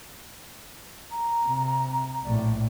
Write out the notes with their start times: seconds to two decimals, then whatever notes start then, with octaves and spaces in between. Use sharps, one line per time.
1.10 A#5
1.45 C3
2.24 A#1 A2 D5